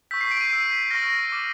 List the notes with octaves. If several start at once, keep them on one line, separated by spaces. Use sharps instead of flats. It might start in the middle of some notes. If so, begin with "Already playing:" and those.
C#6 E6 G6 B6
C7
D7
D#7
C#6 E6 G6 C7
B6
C#6 F6 A#6
D6 F6